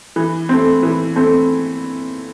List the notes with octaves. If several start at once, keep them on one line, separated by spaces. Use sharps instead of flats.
E3
A3 C4
E3
A3 C4